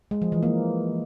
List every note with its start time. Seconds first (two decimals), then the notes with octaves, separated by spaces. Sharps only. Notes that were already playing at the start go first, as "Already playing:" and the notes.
0.11 G#3
0.22 F3
0.32 E3
0.43 A#3